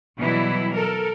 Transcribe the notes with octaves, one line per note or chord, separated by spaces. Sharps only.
B2 E3 F#3 G3 E4
A4 A#4